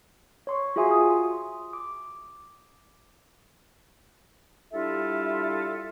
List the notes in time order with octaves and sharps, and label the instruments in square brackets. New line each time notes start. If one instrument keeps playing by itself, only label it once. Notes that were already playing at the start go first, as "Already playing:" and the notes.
[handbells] C#5 C6 C#6
F4 F#4 G#4 E5 G#5 C6
D#6
D6
[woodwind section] G3 D4 E4 F4 A4 E5